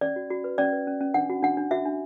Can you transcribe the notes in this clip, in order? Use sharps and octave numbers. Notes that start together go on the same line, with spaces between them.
C#4 D5
F#4
F#4
B4
C#4 D5
B4
C#4
C#4
D4 F#5
F#4
D4 F#5
D4
F#4 E5
D4